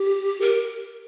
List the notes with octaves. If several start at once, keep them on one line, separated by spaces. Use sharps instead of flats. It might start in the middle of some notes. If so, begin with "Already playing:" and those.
Already playing: G4
A#4